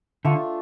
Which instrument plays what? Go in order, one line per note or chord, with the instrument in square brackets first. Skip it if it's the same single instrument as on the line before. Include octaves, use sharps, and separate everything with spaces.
[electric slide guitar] D3 [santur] A3 D4 F4